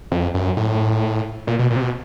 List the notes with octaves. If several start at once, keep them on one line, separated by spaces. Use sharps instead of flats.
F2
F#2
A2
A#2
B2
A#2
C3
B2